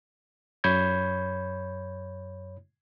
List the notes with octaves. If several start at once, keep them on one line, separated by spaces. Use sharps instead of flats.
F#2 C#5 B5 G6 G#6